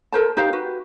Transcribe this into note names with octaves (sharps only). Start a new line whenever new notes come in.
A4 A#4 C5 A5
D#4 G4 C5 F5
F#4 B4